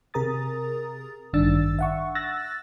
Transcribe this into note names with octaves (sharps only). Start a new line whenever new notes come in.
C3 G#4 A#4 A#5 D#6 A6
A1 G2 D#3 D4 E6 A6
E5 F#5 C#6
E6 F#6 A6 A#6